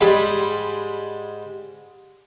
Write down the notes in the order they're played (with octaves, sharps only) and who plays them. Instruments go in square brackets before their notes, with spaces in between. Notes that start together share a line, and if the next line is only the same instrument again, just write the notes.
[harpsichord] G#2 G3 G#3 B5 C6